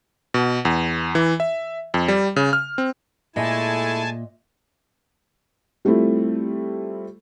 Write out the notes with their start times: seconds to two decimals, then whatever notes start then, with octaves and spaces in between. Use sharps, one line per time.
0.34 B2
0.65 E2
1.15 E3
1.40 E5
1.94 F2
2.08 G3
2.36 C#3
2.53 F6
2.78 C4
3.36 A#2 G#3 A3 E4 D#5 E5 G#5 A5
5.85 G3 A3 C4 E4 F4